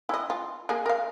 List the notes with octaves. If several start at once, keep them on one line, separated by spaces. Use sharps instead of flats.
E4 D#5
F4
A#3 G#4
A#4 F5